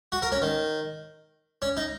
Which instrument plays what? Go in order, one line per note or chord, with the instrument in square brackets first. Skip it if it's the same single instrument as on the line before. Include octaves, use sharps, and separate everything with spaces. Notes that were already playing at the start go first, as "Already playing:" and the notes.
[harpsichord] F#4
A#4
C#4
D#3
C#4
D#4